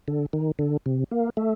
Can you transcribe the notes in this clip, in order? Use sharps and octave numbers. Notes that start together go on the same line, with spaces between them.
D3
D#3
D3
C3
A#3
A3